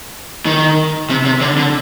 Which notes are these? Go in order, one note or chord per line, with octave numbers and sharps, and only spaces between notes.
D#3
C3
C3
D3
D3